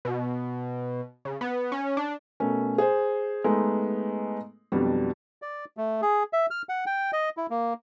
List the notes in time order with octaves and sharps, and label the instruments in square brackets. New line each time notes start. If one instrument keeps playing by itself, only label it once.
[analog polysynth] B2
C#3
B3
C#4
D4
[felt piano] B2 A3 C#4 A#4
G#4 C5
G#3 A3 B3 D#4
F2 B2 F#3 G3 D4
[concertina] D5
A3
G#4
E5
F6
F#5
G5
D#5
E4
A#3